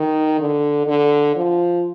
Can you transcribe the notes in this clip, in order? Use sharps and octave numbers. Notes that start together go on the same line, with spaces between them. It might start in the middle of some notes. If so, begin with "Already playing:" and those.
Already playing: D#3
D3
D3
F3